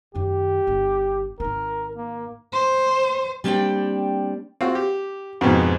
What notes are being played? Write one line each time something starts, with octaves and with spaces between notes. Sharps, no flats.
F#2 D#3 G4
G1
G#1 D#4 A#4
A#3
C5
G3 A#3 C4 D4 D5 G5
C4 F4 F#4
G4
F2 G#2 B2 B3 F#4